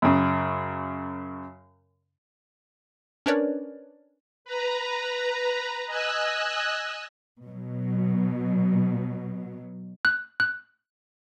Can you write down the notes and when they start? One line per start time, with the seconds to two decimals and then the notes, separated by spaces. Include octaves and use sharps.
0.02 F#2 C#3
3.26 C#4 D4 A#4 B4 C#5 D5
4.45 B4 A#5
5.87 D#5 G#5 E6 F#6
7.45 B2 F#3
10.05 F#6
10.40 F#6